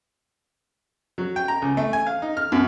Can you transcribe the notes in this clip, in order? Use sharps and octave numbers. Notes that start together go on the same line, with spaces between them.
F#3
G5
A#5
C#2
A3
G#5
F5
D#4
F6
F#2